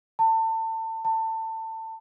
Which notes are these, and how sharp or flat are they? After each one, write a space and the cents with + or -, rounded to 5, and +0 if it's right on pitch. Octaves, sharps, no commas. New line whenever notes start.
A5 +30
A5 +25